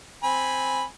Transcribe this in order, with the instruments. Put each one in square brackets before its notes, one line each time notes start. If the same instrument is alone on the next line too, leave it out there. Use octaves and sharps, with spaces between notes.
[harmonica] C4 G#5 B5